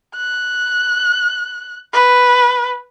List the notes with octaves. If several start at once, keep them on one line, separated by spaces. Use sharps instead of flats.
F#6
B4